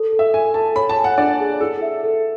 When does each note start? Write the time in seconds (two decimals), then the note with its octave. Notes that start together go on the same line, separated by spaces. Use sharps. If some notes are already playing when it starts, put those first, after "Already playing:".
Already playing: A4
0.13 A4
0.19 E5
0.34 A4 G#5
0.54 A4 A5
0.76 C#5 B5
0.89 A5
0.97 G#5
1.04 F#5
1.18 D4 D5
1.40 G#4
1.61 E4 A4
1.82 E5
2.03 A4